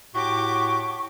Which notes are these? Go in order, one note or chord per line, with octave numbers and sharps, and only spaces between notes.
A2 F#4 G4 C#6 D6